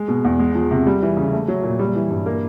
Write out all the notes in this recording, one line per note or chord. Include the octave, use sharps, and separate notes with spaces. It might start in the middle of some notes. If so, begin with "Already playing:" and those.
Already playing: G#3
B2
E2
G#3
F3
C3
G3
E3
C#3
A3
F#3
A#2
G3
E3
G2
A#3